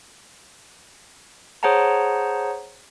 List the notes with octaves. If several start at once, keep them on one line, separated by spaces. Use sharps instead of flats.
G#4 C5 C#5 F#5 A5 A#5